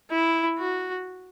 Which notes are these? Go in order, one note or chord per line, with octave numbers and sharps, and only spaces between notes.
E4
F#4